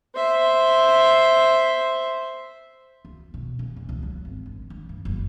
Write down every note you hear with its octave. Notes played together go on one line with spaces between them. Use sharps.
C5 E5
D2
B2
E2
E2
C#2
F#3
G#1
D3
D3
G2
F#1